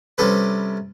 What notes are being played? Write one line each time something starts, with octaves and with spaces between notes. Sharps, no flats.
C3 G3 C#4 A4 B4